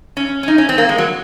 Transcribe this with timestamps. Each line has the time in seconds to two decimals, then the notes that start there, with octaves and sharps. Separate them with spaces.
0.17 C#4
0.43 C#4
0.48 D#4
0.58 C#4
0.69 C4
0.78 A#3
0.89 G#3
0.98 F#3